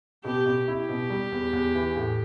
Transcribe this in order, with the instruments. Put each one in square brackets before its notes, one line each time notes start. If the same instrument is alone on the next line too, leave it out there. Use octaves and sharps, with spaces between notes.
[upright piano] B2 [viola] G4
[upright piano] B2
[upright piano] E4 [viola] G4
[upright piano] B2
G3
E2
E2
E3
A2